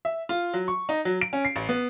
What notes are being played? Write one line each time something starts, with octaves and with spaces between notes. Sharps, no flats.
E5
F4
F#3
C#6
D#4
F#3
D7
C#4
C7
A1
B3